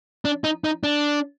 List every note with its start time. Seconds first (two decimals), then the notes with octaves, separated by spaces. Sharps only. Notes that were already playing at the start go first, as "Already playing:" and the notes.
0.25 D4
0.44 D#4
0.64 D#4
0.84 D4